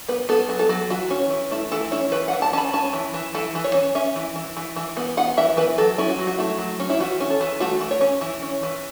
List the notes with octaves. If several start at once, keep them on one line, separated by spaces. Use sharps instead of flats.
B3 B4
B3 A4
F#3
A4
F#3
E3 F#4
C#4
E3
A3 E4
E3 A4
C#4 E4
E3 B4
F#5
E3
A5
C#4 A5 B5
C#4 A5
E3
E3
E3 A4
E3
C#5
C#4
C#4 E5
E3
E3
E3
E3
B3
B3 F#5
E3 E5
E3 B4
F#3 A4
C#4 E4
F#4
F#3
F#4
A3 E4
F#3
C#4
E4
E3 F#4
C#4
A4
E3
A3 F#4
E3
C#5
C#4
E3
C#4
E3